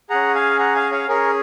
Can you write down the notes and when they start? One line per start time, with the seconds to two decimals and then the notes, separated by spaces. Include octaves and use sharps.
0.10 C#4 G#4 F#5 A#5
0.35 F5 G#5
0.59 F#5 A#5
0.75 F5 G#5
0.92 C#5 F5
1.08 C#4 G#4 A#4 C#5